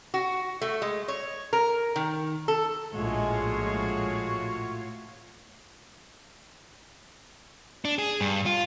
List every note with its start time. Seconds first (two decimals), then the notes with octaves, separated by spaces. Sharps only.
0.14 F#4
0.62 A3
0.82 G#3
1.08 C#5
1.53 A#4
1.96 D#3
2.48 A4
2.94 A#1 A2 G#3 F4 F#4 C#5
7.85 D4
7.99 G#4
8.21 G2
8.46 F4